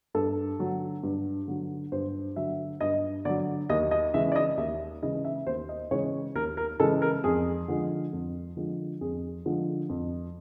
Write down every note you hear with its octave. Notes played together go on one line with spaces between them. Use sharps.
G2 A4
D3 F#3
G2
D3 F#3
G2 C5
D3 F#3 E5
G2 D#5
D3 F#3 D5
D#2 D#5
D#5
C#3 E3 G#3 E5
D5
D#5
D#2 E5
C#3 E3 G#3 D#5
E5
D#2 C5
D#5
C#3 E3 G#3 C#5
D#2 A#4
A#4
C#3 E3 G#3 A4
A#4
F2 G#4
D3 F3 G#3
F2
D3 F3 G#3
F2 G#4
D3 F3 G#3
F2